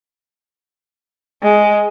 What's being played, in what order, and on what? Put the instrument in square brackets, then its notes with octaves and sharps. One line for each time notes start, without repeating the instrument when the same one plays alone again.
[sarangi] G#3